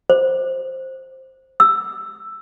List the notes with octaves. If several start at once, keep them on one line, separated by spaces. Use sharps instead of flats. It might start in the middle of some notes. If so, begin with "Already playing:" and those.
C5
E6